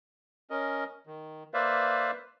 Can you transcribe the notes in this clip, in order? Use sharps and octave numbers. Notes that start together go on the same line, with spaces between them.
C#4 A#4 D#5
D#3
A#3 B4 C5 D5 E5 F5